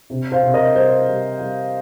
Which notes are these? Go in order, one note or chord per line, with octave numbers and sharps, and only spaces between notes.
C3
C5 F5
C3
A#4 D#5
G3 C5
G3
G3